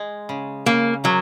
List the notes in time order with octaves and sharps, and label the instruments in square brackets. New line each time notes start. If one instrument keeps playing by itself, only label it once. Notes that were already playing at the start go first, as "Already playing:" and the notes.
Already playing: [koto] G#3
C#3
[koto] C#3 [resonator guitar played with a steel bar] A#3
[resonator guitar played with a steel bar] F#3 [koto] A#3